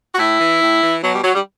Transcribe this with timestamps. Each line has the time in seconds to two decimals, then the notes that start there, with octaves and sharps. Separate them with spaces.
0.15 F#4
0.18 A2 E4
0.41 E3
0.61 A2
0.83 E3
1.03 B2 F#3
1.14 G3
1.24 F#3
1.35 G3